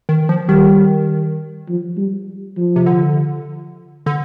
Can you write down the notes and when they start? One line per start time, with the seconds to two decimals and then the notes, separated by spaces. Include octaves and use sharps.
0.09 D#3
0.29 F3
0.48 D#3 G3
1.68 F3
1.97 G3
2.57 F3
2.76 C3
2.86 D3
4.06 D3